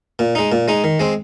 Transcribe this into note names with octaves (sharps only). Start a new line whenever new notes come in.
A#2
G#3 D#4
A#2
G#3 D#4
D#3
G#3 C4